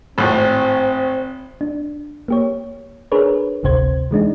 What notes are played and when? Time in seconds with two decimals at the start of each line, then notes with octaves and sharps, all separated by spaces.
0.18 G#1 A2 C4
1.61 D4
2.28 A#3 G4 C#5
3.12 D4 G#4 A#4 B4 C#5
3.63 G#1 D2 C3 C5 G#6
4.11 E3 G#3 D4 D#4